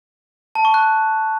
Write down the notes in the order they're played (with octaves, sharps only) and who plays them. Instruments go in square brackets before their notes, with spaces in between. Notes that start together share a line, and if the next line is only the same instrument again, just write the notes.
[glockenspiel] A5
C#6
F#6